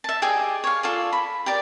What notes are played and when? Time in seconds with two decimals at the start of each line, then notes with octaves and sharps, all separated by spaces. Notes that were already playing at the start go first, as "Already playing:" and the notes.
0.04 E5 A5
0.22 G4 G#4 D5 D#5
0.64 C#5 F5
0.83 F4 A4 D5
1.13 B5
1.46 G4 A#4 D5